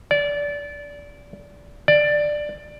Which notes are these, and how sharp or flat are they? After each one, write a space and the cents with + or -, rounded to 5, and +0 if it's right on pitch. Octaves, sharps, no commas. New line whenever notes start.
D5 -20
D5 +10